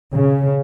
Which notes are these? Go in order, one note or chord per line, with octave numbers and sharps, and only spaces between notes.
C#3